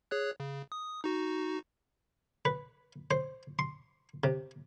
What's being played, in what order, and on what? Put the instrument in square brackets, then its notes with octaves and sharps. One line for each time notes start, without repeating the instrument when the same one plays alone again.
[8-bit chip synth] G#4 C#5 F#6
C#3
D#6
D#4 F#4
[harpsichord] B4
C5
C6
C3